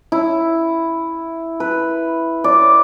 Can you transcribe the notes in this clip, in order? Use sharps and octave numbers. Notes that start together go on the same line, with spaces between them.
E4
B4
D5